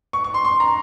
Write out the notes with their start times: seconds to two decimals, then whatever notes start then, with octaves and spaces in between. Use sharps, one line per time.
0.13 C#6
0.24 C#6
0.34 C6
0.45 C6
0.60 A#5